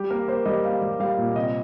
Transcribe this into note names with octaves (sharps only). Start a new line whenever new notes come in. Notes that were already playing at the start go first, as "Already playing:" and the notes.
Already playing: G3 G4
A#3 A#4
A#3 C5
G3 D#5
A#3 F5
G3
G3 F5
A#2
C3 D#5